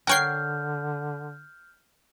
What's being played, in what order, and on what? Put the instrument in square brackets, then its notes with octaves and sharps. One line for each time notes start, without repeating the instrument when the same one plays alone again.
[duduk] D3 [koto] A#4 C#5 [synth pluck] F#5 G5 C7 [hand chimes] F6 G6